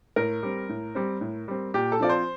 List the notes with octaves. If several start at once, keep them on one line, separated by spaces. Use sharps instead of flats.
A2 A#4
G3 C4
A2
G3 C4
A2
G3 C4
A#2 G4
A4
F3 C4 F4 D5
C5